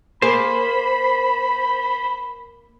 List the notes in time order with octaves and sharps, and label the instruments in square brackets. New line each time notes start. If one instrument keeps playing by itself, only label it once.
[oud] A#3 G#4 [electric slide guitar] C5 [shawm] B5